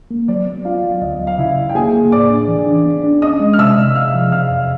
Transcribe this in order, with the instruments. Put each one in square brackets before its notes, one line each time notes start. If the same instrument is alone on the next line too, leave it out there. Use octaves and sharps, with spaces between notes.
[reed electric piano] A#3
[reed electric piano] F#3 [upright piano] D5
[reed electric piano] B3
[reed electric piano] B3 [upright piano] F4 F5
[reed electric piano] F#3
[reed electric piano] D2 [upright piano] D#5
[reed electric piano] F#3
[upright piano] F5
[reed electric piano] C#3 [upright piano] E4 E5
[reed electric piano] C#3
[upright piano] G5
[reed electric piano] A#3 [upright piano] G#4 G#5
[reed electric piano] A#3
[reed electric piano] A2 [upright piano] D5 D6
[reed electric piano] D4
E3
D4
B3
D4
[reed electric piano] C#4 [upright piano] D#5 D#6
[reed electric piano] G#3
[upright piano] F6
[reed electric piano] C3 [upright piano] E5 E6
[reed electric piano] C3
[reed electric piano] C3 [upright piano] F5 F6
[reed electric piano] F3
[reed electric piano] C3 [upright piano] F5 F6
[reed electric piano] F2